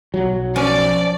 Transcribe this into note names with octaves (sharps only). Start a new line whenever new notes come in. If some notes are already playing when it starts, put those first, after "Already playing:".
B1 F#3
F3 C#4 D5